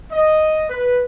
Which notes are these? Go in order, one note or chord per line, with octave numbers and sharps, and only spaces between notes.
D#5
B4